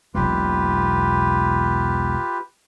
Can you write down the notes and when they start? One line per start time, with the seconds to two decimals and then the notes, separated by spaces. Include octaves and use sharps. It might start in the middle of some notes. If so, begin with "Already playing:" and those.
0.15 E1 B1 A#3 F4 G4 B4